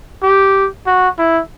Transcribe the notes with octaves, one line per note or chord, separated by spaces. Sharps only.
G4
F#4
E4